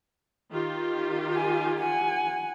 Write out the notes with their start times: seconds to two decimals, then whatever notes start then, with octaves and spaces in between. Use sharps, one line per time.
0.50 D#3 F4 G4
1.35 G#5
1.79 F#5 G#5